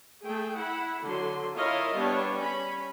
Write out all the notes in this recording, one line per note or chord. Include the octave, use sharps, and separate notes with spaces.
A3 G#4 G5
E4 F#5 B5
D3 F#3 C6
E4 F4 A#4 C#5 D#5 F5
G3 B3 D4 C#5
C#4 B5